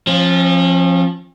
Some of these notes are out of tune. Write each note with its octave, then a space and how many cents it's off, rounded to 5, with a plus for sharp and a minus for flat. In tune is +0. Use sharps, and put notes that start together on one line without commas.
F3 +0 C#4 -45